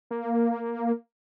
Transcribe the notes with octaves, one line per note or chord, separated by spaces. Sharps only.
A#3